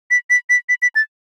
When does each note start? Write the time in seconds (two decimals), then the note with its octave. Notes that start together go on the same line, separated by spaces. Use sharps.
0.11 B6
0.30 B6
0.50 B6
0.69 B6
0.82 B6
0.95 A6